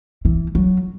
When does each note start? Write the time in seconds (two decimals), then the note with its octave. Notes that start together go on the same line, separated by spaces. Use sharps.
0.25 E3
0.55 F#3